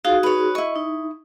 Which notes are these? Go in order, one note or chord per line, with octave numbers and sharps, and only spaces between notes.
D#4 F4 F#4 G#4
B4 C#5
E4 D#5 C#6
D#4